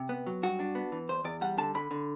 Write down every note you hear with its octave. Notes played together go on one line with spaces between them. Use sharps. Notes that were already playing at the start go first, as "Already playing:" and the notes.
Already playing: C3
B3
F#3
G2 F#4
D4
B3
E3
E2 C5
E2 D5
G3 F#5
D3 A5
D3 B5
D3